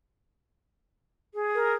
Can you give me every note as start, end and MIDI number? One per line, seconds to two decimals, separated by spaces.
1.34 1.76 68
1.54 1.74 70